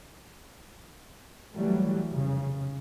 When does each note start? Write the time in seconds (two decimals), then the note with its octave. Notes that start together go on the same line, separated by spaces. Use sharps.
1.55 E3 F#3 G3 A3
2.14 F1 C#3